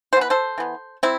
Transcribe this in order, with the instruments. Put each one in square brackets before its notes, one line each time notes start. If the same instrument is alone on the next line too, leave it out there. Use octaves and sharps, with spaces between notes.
[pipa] E3 C5
B3 B4
A4 C5
E3 B3
C3 C4 E4